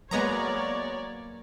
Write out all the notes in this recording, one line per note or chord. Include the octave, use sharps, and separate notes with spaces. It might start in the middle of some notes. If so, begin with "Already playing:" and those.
F#3 G#3 A#3 B3 C#5 D5 A#5